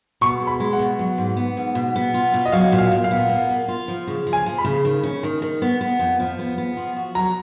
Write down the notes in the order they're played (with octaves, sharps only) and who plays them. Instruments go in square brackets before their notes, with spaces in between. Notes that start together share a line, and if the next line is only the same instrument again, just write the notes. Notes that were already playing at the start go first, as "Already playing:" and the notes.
[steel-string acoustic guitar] B2 [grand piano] C#6
[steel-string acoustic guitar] G#3
[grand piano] B5
[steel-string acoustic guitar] G#3
[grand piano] F#5
[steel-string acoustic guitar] B2
F#3
G#2
B3
G#2
B2
B3
F4
B2
[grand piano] D#5
[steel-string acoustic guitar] F#3 [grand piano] F5
[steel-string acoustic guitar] A#2
[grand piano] F5
[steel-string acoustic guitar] A#2
[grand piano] F5
[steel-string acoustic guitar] B3
A#3
A#3
F4
F3
C#3
F3
[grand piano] G#5
[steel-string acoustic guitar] F3
[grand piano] B5
[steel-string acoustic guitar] C#3
D#3
C#4
D#3
D#3
B3
B3
F2
F3
B3
B3
F3
F#4
[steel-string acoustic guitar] F#3 [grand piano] A#5